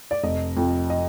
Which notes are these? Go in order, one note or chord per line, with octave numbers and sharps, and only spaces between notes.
D5
F1 D#5
F2 F3
D#5